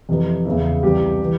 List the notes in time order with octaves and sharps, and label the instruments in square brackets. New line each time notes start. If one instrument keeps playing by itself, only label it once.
[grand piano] F2 C3 E3
E2 C#3 E3 E4
C2 C3 E3 G4
E3